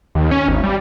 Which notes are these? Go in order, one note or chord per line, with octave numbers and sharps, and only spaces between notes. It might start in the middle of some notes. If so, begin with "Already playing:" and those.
D#2
C#4
G#1
G3